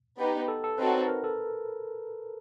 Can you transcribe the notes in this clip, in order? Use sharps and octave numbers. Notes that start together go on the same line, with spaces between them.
B3 D#4 G4 B4
A4
A4
C4 D#4 F#4 A4 B4 C#5
A#4
A4